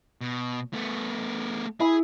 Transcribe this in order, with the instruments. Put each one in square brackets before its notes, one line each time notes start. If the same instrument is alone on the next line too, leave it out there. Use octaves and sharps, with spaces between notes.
[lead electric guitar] B2
A3 B3
[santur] E4 [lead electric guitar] G#4